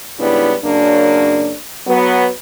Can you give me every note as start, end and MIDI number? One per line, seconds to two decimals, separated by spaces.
0.19 0.53 44
0.19 0.53 49
0.19 0.53 55
0.19 0.53 59
0.19 0.53 62
0.19 0.53 64
0.64 1.54 42
0.64 1.54 49
0.64 1.54 58
0.64 1.54 62
1.87 2.28 54
1.87 2.28 59